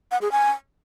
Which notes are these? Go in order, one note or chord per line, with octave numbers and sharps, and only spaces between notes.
F#5
G#4
G#5